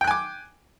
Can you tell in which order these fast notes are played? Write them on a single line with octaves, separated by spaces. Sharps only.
G5 F#6 G#5 D6